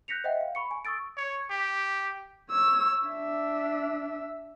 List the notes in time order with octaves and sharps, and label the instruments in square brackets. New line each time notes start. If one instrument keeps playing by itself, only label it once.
[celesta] F#6 G6 A#6 B6 C#7 F7
C5 D#5 E5 F#5 G5
F5
B5 C#6 C#7
G#5
C#6 D#6 E6 A6 D7
[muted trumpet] C#5
G4
[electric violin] C#5 E6
D4 E5